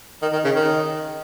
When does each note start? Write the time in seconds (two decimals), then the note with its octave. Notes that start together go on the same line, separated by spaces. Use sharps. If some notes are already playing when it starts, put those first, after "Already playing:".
0.22 D#3
0.33 D#3
0.44 C#3
0.55 D#3